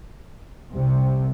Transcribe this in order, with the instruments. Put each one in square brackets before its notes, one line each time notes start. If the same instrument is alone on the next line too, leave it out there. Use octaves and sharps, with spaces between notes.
[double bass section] C2 C3